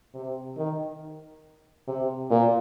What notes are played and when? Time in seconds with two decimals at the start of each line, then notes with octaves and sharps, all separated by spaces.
0.14 C3
0.57 D#3
1.88 C3
2.30 A#2